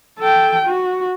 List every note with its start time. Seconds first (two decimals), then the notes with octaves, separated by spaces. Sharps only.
0.19 A4 G5
0.66 F#4